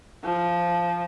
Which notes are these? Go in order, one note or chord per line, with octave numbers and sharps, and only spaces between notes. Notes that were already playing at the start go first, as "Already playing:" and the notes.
F3